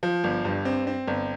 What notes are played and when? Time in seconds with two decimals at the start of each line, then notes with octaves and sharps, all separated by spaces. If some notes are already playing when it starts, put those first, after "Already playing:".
0.03 F3
0.24 G1
0.45 G2
0.65 C4
0.87 C4
1.08 G1